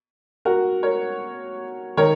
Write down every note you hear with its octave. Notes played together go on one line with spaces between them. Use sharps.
F#4 A#4
A#4 C#5
D#3 A#4 C#5